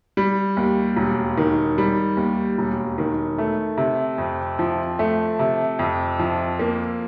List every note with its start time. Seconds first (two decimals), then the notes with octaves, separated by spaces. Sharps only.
0.17 G3
0.57 D#2
0.97 E1
1.37 D#3
1.78 G3
2.17 D#2
2.58 E1
2.98 D#3
3.38 A3
3.77 C3
4.18 F2
4.59 F3
4.99 A3
5.39 C3
5.79 F2
6.19 F3
6.60 A#3